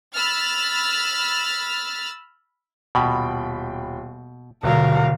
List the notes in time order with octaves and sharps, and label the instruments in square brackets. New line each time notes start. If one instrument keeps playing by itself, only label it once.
[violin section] B5 E6 F6 A6
[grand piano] D#1 G5 B5 [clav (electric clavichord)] B2
[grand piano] D#1 F#3 [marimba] B2 D3 [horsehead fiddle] A#4 F5